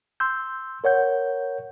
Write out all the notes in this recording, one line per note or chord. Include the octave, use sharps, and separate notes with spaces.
C6 E6 G6
A#4 C#5 F#5 G6